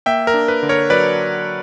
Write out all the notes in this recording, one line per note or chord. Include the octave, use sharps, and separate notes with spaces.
A#3 E5 G5
A#4
D4
B4
D3
A#4 C#5
F#3 B4 D5